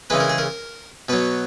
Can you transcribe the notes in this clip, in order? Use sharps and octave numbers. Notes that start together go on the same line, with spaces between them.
C#3 E3 G#3 B4
A#4
G#4
A#4
B2 F#3 B4